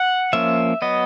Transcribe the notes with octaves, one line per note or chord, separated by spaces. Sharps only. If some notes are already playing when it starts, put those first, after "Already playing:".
Already playing: F#5
F3 A#3 C#4 E5
F#3 B3 D#5